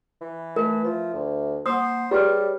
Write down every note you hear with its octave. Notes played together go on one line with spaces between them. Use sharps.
E3
A3 A#4 B4
F3 E5
D2
A#3 C5 F#5 D#6
G3 G4 G#4 B4 C#5